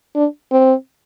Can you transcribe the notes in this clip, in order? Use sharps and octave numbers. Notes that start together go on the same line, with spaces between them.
D4
C4